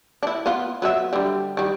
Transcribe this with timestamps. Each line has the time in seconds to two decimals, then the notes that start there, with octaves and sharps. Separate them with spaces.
0.23 D4 E4
0.46 B3 F4
0.82 F#3 B4 E5
1.13 D3 G3
1.57 D#3 G3